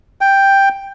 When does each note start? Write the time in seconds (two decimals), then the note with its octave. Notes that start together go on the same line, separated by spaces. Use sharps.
0.21 G5